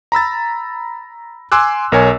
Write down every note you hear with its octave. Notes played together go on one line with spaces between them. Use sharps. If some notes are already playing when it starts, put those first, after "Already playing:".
A#5 B5 E6 A6
G#5 C6 D6 E6 F#6
B1 A#4 C#5 G#5